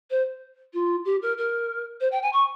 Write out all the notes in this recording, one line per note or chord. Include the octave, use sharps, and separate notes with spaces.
C5
F4
G4
A#4
A#4
C5
G5
G#5
C#6